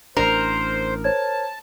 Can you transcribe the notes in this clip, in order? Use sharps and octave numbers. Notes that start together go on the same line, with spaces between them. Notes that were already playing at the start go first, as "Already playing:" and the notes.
A1 D4 A#4 C5
C5 C#5 A5 G#6